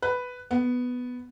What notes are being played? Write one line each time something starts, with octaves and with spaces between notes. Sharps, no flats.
B4
B3